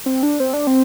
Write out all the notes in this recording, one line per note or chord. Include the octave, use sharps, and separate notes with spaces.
C4
D4
C4
D4
C4